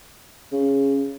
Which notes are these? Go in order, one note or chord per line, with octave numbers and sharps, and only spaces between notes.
C#3